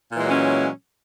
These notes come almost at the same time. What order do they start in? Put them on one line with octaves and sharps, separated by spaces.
A#2 E3 G#3 F#3 C#4